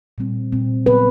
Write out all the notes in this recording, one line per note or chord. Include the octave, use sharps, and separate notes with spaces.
A#2 G3 C4
A#2 G3 C4
C#3 F#3 B3 B4